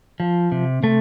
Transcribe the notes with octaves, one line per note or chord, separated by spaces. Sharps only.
F3
C3
C3 A3